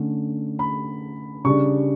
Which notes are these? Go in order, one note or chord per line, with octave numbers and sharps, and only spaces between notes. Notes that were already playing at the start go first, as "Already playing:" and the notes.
Already playing: D3 A3 C#4
B5
C#3 G3 D4 C#6